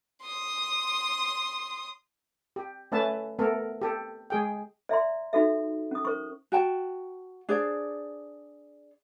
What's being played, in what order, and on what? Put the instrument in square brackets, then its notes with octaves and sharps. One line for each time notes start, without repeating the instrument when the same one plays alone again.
[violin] C6 D#6
[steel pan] G4
A3 C#4 B4 E5 A5
A3 B3 A4 A#4
G4 A4
G#3 G#4 G5
[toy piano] D5 E5 A#5 C6
D#4 F#4 A4 E5
C#4 D#6
A#4 C5 C#6
[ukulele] F#4 G5 A5
D4 G#4 C5 D5